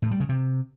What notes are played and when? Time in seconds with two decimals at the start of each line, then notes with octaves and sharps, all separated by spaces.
0.02 A2
0.11 G3
0.20 C#3
0.29 C3